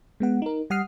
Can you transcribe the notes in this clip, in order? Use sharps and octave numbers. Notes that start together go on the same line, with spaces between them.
G#3 B3 F#5
D#4 A#4
G3 F#5 D#6 F6 C7